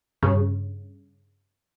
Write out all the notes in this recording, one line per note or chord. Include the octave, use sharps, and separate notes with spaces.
G2 C#3